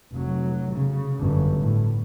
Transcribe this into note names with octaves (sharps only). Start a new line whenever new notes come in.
F1 F#3
C#3
G1 F#2
A2